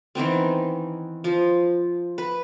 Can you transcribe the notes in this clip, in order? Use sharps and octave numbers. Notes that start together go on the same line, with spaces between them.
D#3 E3 B3 C4
F3
B4